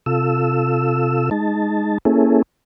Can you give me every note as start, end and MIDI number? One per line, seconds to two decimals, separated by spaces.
0.06 1.30 48
0.06 1.30 65
0.06 1.30 69
0.06 1.30 88
1.31 1.98 56
1.31 1.98 63
1.31 1.98 81
2.05 2.42 58
2.05 2.42 61
2.05 2.42 64
2.05 2.42 68
2.05 2.42 69